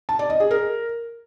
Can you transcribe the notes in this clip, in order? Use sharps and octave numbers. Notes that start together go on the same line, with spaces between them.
A5
D5
D#5
G#4
A#4